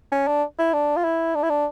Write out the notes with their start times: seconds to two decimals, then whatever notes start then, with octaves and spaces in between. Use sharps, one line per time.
0.12 C#4
0.28 D4
0.58 E4
0.74 D4
0.96 F4
1.04 E4
1.35 D4
1.43 E4
1.50 D4